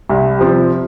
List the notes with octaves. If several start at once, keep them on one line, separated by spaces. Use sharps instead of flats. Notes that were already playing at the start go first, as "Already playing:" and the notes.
C2
C3 F3 C4